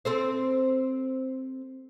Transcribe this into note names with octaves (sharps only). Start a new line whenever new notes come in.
C4 A4 C5